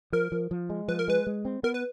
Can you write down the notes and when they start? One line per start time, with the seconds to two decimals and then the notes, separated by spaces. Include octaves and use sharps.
0.13 F3 A#4
0.32 F3
0.51 F3
0.70 G#3
0.88 F3 B4
0.99 A#4
1.08 G#3 B4
1.27 G#3
1.45 C4
1.63 B3 A#4
1.74 B4